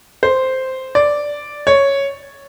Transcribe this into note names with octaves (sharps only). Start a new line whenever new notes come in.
C5
D5
C#5